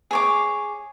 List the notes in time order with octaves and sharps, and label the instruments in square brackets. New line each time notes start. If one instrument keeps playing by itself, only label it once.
[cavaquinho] G#4 C#5 D6